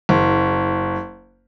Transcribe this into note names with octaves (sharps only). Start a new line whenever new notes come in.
F#1